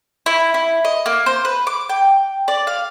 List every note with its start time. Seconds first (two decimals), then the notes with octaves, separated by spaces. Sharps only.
0.26 E4
0.54 E4
0.85 D#5
1.06 A#3
1.26 C5
1.45 B4
1.67 D6
1.89 G5
2.48 D5
2.67 F5